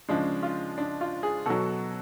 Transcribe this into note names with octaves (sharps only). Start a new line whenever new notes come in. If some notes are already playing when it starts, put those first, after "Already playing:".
C#3 F3 G#3 D4
F4
D4
F4
G#4
B2 F#3 A4